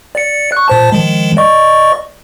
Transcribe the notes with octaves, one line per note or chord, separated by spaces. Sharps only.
D5 C#7
C#6 F#6
A#2 C5 A5
D#3 F3 G#3
D5 D#5 C#6